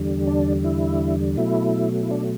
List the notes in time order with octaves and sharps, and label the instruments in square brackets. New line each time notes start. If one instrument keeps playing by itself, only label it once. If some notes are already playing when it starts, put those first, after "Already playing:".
Already playing: [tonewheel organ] E2 D3 G3
D4
E4
B2 F#3 A3 E4
E4
D4